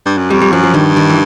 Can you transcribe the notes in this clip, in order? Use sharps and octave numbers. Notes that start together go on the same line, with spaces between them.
G2
F#2
F2 G3
G3
F#2 F3
F3
G2 D#3
D#3
E3